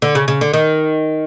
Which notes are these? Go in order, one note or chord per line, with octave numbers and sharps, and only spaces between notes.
D3
C#3
C#3
D3
D#3